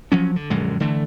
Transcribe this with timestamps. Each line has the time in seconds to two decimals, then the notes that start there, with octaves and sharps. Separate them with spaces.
0.12 F3 F#3 C#4
0.36 D3
0.50 A#1 F#2 D3 G#3
0.80 D3 E3 A3